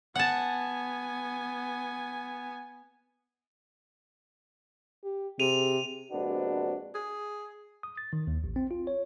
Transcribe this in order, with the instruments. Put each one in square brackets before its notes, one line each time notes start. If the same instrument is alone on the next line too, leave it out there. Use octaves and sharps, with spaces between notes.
[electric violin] B3 G#5 [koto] F#5 A5
[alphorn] G4
[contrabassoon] C3 [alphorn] G#4 [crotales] D#7 F7
[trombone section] A#1 C3 G#3 B3 D4 F#4
[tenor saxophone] G#4
[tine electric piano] D#6
A6
D#3
D#2
A1
C4
F4
C#5